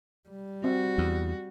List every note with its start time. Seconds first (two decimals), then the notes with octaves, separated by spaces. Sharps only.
0.29 G3
0.64 C4 F#4
0.98 E2